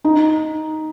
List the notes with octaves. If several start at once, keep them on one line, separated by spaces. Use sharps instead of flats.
D#4